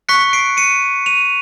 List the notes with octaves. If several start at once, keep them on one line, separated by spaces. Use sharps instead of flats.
C#6 F#6 B6 C#7
C7 D7
C#7 D#7
D#7 F7